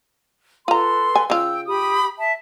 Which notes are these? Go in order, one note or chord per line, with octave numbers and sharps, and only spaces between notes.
F4 A4 B4 A#5 C6
G#5
C#3 F4 G5 E6
G4 B5 D#6
E5 A5